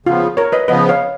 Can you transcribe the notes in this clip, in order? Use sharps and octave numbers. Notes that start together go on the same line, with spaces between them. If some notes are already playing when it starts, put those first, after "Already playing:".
C#3 F3 B3 F4
A#4 C#5
B4 D#5
C#3 F3 B3 B4 D#5
C#5 F5